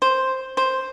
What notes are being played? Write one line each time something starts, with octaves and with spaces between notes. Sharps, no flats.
C5
C5